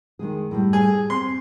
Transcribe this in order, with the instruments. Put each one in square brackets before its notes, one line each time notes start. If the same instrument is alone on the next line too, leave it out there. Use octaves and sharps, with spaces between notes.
[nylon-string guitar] D#3 G#3 G#4
A2 G3
[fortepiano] G#4
[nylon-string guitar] C4 [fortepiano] C6